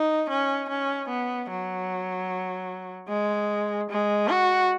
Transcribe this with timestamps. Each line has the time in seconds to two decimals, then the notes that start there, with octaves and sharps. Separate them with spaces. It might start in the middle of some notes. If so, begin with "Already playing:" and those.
Already playing: D#4
0.30 C#4
0.69 C#4
1.09 B3
1.50 F#3
3.09 G#3
3.90 G#3
4.29 F#4